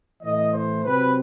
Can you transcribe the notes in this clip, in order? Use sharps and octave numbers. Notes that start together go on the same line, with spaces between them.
A2 E3 A3 D#5
C5
C3 F#3 C4 B4